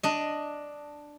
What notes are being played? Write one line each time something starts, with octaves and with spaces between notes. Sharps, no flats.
D4 D#5